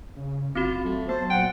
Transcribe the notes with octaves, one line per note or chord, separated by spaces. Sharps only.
C#3
F#1 C4 F4 F#4
F#3 A3
B3 C5 A5
A#2 F#5 G5